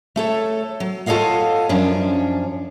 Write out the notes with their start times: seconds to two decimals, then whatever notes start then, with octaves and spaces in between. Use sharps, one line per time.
0.16 A3 A4 C#5
0.80 F#3
1.06 F4 A4 C#5 D#5 F5 F#5
1.69 F#2 F3 C#4 D4